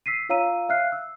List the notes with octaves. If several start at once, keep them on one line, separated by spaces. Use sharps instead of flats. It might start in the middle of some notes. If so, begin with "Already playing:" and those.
E6 B6 C7 D#7
F4 C#5 F5 A#5 E6 D#7
E5 F5 F6 F#6 C7
E6